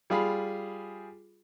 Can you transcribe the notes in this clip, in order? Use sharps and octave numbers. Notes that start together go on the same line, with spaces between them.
G3 F4 G#4 F5 B5